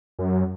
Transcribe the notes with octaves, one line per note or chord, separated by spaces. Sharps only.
F#2